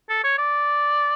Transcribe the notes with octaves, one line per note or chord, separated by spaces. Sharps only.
A4
C#5
D5